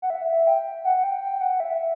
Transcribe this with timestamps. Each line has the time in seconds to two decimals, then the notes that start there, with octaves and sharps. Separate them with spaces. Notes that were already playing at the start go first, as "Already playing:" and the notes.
0.02 F#5
0.10 E5
0.47 G5
0.85 F#5
1.03 G5
1.22 G5
1.41 F#5
1.60 E5